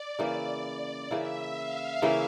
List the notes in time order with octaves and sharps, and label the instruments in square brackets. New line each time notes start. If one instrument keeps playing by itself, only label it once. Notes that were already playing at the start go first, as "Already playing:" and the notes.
Already playing: [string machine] D5
[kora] C#3 E3 A#3 E4
[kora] C#3 E3 A#3 E4 [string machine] E5
[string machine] F5
[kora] C#3 E3 A#3 E4